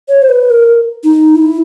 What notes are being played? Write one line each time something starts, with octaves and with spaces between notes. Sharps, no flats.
C#5
C5
B4
A#4
D#4
E4